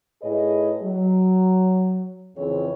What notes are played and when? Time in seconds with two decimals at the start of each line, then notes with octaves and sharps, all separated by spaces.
0.21 A2 D#4 G#4 B4 C#5 D#5
0.82 F#3
2.36 F2 C#3 E3 C4 G#4 C#5